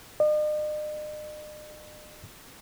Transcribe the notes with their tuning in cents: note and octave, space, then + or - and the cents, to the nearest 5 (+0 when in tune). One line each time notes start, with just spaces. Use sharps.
D#5 -45